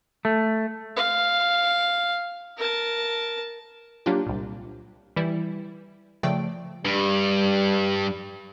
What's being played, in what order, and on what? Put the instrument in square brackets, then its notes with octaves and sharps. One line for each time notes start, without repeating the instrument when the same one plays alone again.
[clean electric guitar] A3
[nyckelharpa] F5
A#4 A5
[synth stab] F#3 A#3 D4 F4 G4
C2 A#2
E3 G3 E4
C#3 F3 A3 D5 G5 D7
[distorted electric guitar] G2 [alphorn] G3